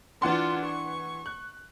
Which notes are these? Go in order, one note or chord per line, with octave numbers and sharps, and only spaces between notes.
E3 D4 F4 F#5 C6
C#6
F#6